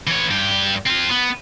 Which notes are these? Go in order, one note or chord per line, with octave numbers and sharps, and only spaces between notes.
E3 C#5
G2 G4
C4 F4
B3